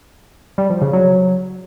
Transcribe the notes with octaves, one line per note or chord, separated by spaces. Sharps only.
G3
F3
C#3
F#3
F#3